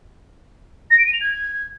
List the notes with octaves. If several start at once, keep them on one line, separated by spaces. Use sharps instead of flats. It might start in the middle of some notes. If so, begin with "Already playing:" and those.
A#6
D7
D#7
F7
G#6